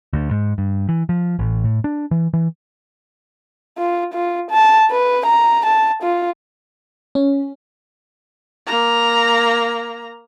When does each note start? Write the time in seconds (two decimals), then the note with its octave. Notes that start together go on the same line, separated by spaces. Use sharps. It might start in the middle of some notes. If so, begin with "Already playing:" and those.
0.13 D2
0.31 G#2
0.58 G2
0.89 E3
1.09 F3
1.39 A1
1.64 A2
1.84 D4
2.11 E3
2.33 E3
3.78 F4
4.14 F4
4.51 A5
4.91 B4
5.26 A#5
5.66 A5
6.03 F4
7.15 C#4
8.67 A#3 A#5